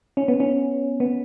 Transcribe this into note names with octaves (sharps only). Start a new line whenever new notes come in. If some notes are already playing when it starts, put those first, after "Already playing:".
C#4
B3
C#4
B3